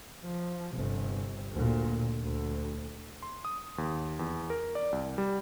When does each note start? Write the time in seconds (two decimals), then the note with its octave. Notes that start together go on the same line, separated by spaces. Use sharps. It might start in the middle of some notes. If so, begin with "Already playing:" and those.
0.24 F3
0.74 G1 C3
1.53 D2 A#2
2.23 D2
3.22 C6
3.45 D#6
3.78 D#2
4.19 E2
4.50 A#4
4.75 D5
4.92 C2
5.18 G3